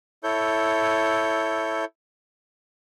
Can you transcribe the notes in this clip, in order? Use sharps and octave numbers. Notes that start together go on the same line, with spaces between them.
E4 A4 C#5 G6